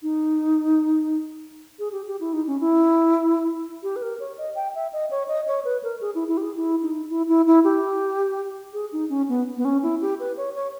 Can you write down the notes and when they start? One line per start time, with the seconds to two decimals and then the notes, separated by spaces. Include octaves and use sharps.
0.03 D#4
1.79 G#4
1.92 G4
2.07 G4
2.20 E4
2.33 D#4
2.47 C#4
2.60 E4
3.83 G4
3.96 B4
4.02 A#4
4.20 C#5
4.38 D#5
4.55 G5
4.75 E5
4.93 D#5
5.10 C#5
5.28 D#5
5.47 C#5
5.65 B4
5.83 A#4
6.01 G#4
6.15 E4
6.28 E4
6.37 G4
6.42 G#4
6.56 E4
6.82 D#4
7.10 E4
7.29 E4
7.47 E4
7.64 G4
8.73 G#4
8.92 D#4
9.09 C#4
9.28 B3
9.57 B3
9.65 C#4
9.83 E4
10.01 G4
10.20 B4
10.37 C#5
10.55 C#5